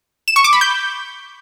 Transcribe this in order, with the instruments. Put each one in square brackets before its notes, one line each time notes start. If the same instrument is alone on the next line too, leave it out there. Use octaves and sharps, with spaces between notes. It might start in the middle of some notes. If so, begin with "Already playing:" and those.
[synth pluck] E7
C#6
D6
B5
G6